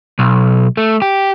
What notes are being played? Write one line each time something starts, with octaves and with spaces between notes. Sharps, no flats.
B1
A3
G4